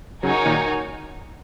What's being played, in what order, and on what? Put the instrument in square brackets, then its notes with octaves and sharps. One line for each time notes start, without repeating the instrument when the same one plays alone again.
[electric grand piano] C#3 F#3 [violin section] D#4 F#4 A#4 C#5 G#5
[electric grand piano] A#2 D#3